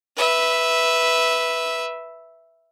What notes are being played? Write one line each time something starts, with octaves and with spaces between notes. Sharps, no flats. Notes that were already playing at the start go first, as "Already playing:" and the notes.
B4 E5